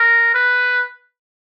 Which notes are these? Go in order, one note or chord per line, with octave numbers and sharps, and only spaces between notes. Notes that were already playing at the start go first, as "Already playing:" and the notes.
Already playing: A#4
B4